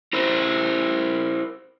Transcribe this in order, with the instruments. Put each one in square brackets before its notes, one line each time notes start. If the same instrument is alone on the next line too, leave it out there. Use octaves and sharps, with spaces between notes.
[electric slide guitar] E4 A#4 C5